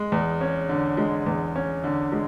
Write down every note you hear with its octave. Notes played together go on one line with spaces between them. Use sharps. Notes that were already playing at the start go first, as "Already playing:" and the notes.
Already playing: G#3
E2
C#4
D3
G#3
E2
C#4
D3
G#3